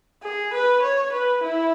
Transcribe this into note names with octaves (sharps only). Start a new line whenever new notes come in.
G#4
B4
C#5
B4
E4